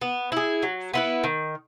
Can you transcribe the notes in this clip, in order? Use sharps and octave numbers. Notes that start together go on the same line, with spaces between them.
B3
E4 G#4
F#3
B3 E4 B4
D#3